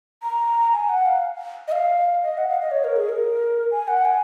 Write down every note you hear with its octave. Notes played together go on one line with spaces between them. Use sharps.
A#5
G#5
F#5
F5
D#5
F5
D#5
F#5
F5
D#5
C#5
A#4
G#4
A#4
G#5
F#5
G#5